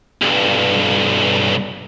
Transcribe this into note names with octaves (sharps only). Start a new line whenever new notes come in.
B1 G2